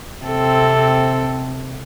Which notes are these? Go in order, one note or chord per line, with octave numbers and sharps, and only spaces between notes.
C3 C4 A4